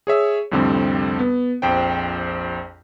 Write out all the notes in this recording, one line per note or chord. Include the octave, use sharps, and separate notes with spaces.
G#4 C#5 E5
C2 F2 A2 D3 G3 C4
B3
A#1 F2 C5 G5